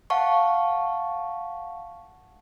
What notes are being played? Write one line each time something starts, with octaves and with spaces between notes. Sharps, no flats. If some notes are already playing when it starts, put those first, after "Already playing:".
F5 F#5 A5 C#6